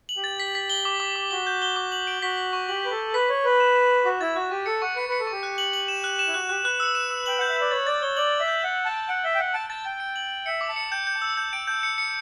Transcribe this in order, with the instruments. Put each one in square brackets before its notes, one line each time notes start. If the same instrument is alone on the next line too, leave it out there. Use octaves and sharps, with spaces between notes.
[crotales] F#7
[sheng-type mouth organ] G4
[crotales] A6
B6
B6
G7
D6
D6
D6
[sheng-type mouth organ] F#4 [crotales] G7
[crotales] G6
G7
D6
F#7
D7
[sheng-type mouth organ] F#4 [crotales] B6
[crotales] B6
C#6
[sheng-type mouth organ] G4 [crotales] F#7
[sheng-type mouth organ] B4 [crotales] G6
[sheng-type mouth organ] A4
[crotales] G6
[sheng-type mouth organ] B4 [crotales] B6
[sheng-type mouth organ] C#5 [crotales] B6
[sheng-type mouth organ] B4 [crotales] B6
[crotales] E7
E7
E7
[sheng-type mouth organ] F#4 [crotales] D6
[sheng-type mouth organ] E4 [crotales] A6
[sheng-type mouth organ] F#4 [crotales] F#6
[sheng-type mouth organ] G4 [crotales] C#6
[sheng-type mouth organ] A4 [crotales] C#7
[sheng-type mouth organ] F#5 [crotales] C#6
[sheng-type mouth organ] B4 [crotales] C#7
[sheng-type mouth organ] B4 [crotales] C#7
[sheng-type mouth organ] A4
[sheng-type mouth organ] G4 [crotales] C#6
[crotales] F#6
F#7
F#7
E7
F#6
E7
[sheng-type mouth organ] E4
[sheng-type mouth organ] F#4 [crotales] F#6
[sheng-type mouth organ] G4 [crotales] F#6
[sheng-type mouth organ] B4 [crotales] F#6
[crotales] E6
E7
E6
[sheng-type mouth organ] G5 [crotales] F#7
[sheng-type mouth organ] F#5 [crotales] G6
[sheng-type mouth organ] E5
[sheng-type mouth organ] D5 [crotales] G6
[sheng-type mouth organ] C#5 [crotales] A6
[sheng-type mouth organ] D5 [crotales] A6
[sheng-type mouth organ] C#5 [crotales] G7
[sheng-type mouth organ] D5 [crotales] F#7
[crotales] D7
[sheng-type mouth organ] E5
[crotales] G6
[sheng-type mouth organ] F#5 [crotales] F#7
[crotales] A6
[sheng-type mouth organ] A5
[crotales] D7
[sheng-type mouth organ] F#5 [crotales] D7
[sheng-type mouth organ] E5 [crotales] G7
[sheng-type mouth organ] G5
[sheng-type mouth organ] F#5 [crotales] D7
[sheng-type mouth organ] A5 [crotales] D7
[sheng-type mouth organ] A5 [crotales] A6
[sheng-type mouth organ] G5 [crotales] A6
[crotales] D7
F#7
F#7
[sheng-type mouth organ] E5 [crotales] C#7
[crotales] D6
[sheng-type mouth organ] A5
[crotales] C#7
[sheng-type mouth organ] G5 [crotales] G6
[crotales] G6
[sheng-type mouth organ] A5
[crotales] E6
[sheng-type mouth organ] A5 [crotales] G6
[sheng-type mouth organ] G5 [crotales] D7
[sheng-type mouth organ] A5 [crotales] G6
[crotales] C#7
C#7